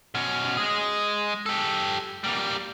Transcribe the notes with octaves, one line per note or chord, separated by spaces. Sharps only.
B2 C#4
G#3 G#4
G4 A4
G3 A#3